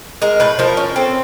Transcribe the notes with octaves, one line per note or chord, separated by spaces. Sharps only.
G#3 A#4
A2 B4
F3 A#4
C#4
C4 A4